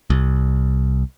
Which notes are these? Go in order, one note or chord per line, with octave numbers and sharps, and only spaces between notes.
C2